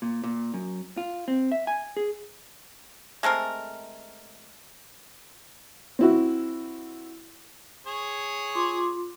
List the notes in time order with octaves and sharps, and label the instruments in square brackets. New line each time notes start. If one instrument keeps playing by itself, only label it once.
[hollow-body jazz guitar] A#2
A#2
F#2
F4
C4
E5
G#5
G#4
[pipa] G#3 A3 C4 A#4
[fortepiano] C4 E4 F#4
[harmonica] G#4 C#5
[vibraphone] F4 C6 D6